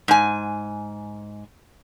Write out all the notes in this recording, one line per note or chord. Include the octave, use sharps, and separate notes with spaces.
G#2 G#5